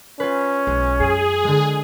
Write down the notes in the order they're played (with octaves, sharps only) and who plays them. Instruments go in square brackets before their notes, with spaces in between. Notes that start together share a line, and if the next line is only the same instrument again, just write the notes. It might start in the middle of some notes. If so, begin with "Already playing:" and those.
[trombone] C#4 [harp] F4 B4
[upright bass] B1 [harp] G#3
[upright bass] F#2 [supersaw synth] G#4
[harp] D3 G#3